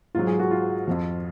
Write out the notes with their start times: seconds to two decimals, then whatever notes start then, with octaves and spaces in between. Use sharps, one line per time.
0.15 G#2 F#3 F4
0.27 G#4
0.40 F#4
0.51 F4
0.87 F2 F3